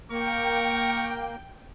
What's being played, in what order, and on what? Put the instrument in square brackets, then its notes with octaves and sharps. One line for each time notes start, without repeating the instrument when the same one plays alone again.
[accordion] A#3 [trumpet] A#4 [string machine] G5 [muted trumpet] C#6